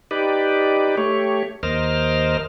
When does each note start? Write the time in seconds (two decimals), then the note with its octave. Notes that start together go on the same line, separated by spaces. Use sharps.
0.11 D#4 G4 B4 D5
0.97 A3 G4 C#5
1.63 D#2 A#4 C5 D#5 F6